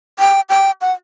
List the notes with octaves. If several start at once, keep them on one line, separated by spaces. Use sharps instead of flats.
G5
G5
F#5